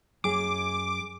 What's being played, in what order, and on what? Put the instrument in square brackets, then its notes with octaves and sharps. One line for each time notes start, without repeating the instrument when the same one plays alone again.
[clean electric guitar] F#2 G#4 [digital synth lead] D6